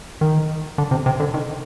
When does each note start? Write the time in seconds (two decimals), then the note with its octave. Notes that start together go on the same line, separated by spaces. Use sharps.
0.21 D#3
0.78 D3
0.91 C3
1.06 C3
1.20 D3
1.34 D#3